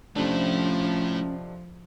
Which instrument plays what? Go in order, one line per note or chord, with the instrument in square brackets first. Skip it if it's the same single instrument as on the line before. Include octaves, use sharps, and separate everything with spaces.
[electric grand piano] F2 C3 D4 [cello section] F3 [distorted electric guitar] A3 E4 [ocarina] C#4